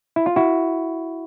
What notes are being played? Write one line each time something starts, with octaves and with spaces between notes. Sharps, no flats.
E4
F4
E4 F#4